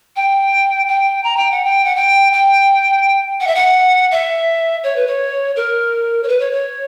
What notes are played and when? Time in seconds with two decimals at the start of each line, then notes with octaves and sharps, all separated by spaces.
0.16 G5
0.88 G5
1.23 A#5
1.36 G5
1.50 F#5
1.64 G5
1.84 F#5
1.95 G5
2.32 G5
3.40 F#5
3.47 E5
3.55 F#5
4.11 E5
4.83 C#5
4.96 B4
5.07 C#5
5.56 A#4
6.23 C#5
6.28 B4
6.39 C#5
6.52 C#5